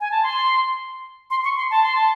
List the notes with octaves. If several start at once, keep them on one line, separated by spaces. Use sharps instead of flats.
G#5
A5
C6
C6
C#6
C6
A5
C6
A5